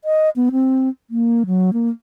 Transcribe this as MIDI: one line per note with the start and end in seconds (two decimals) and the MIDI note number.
0.04 0.30 75
0.36 0.50 59
0.52 0.89 60
1.10 1.43 58
1.47 1.70 54
1.73 1.89 58